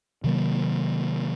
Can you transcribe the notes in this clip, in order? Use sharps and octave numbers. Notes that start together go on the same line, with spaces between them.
C3 D#3 F#3 A#3